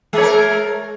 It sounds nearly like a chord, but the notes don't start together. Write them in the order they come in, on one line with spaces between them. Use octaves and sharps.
G#3 C#5 A#4